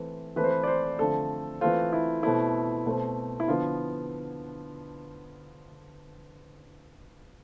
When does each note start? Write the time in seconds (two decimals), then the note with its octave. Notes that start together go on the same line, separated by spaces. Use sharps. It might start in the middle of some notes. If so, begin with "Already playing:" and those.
Already playing: E3 A3 C4
0.36 E3 A3 C4 B4
0.44 C5
0.51 B4
0.63 D5
0.67 C5
0.99 D3 F3 A3 C4 A4
1.61 E3 A3 C4 F4
1.93 E4
2.23 B2 A3 C4 E4
2.86 B2 A3 C4
3.40 E4
3.48 D3 F3 B3 F4